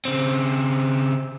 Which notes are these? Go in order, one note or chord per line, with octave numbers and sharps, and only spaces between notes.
C#3 C4